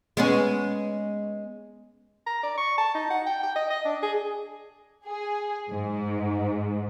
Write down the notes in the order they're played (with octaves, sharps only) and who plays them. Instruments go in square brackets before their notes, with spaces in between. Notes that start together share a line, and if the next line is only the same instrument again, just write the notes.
[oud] G#3 B3 C#4
[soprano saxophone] A#5
D5
C#6
A5
D#4
F#5
G5
G5
D#5
D#5
D4
G#4
[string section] G#4
G#2